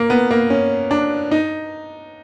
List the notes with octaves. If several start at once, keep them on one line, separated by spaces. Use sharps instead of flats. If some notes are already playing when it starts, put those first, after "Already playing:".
Already playing: A#3
B3
A#3
C#4
D4
D#4